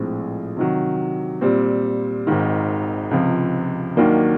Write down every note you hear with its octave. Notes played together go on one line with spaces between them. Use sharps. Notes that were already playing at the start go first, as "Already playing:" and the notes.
Already playing: A#1 A2 F3 G#3 C4
C3 D#3 F#3
A#2 G3 C4
G#1 G#2 D#3
C#2 C3 F3
D#2 D#3 F#3 A#3 D4